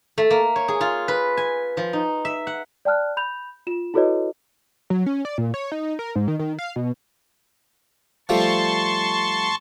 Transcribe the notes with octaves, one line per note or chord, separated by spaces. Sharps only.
A3
A#3
C#5
G#4
F4
B4
G#5
F3
D#4
E5
F#5
D5 G5 A5 F6 F#6
B5 G6 F7
F4 E7
E4 F#4 A4 B4 C#5 D#5
F#3
C#4
D5
A#2
C#5
D#4
A#4
G#2
D#3
D#3
F5
B2
F3 G3 A3 A5 C6 C#6